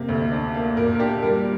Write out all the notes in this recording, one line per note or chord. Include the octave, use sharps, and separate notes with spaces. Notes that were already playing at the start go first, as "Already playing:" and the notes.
Already playing: C3 A#3
D2
D4
A#3
A#2 A#4
A#4
D4 G4
G3 A#4